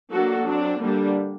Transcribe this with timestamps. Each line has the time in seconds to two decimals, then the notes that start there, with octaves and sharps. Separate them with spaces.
0.11 F#3 A#3 D4 F#4 A4
0.45 F#3 C4 D4
0.80 D3 G3 A#3 D4